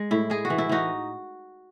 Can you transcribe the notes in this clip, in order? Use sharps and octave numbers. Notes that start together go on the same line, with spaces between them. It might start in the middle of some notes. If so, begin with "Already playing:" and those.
Already playing: G#3
A2 E4
G#3 G#4
F#4
E3
E4
E3 D#4 F#4